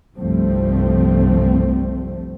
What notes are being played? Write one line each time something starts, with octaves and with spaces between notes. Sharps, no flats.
G1 C2 G2 F3 A3 C4